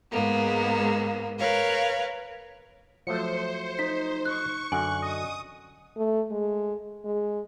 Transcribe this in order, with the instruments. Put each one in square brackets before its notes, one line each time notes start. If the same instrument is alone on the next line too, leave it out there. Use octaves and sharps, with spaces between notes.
[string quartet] G#2 G#3 A#3 B3
A#4 B4 C#5 F5
[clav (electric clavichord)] F3 F#3 A3 [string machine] C5 [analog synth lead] C#7
[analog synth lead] D#4 [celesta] B6
[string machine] C#6 [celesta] F#6
[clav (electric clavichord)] F#2 D3 F#4 [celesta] G#5 [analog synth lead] F#6
[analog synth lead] D#5 [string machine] D#6
[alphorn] A3
G#3
G#3